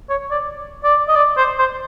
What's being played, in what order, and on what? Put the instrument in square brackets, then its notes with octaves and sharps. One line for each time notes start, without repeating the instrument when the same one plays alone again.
[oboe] C#5
D5
D5
D#5
D5
C5
C5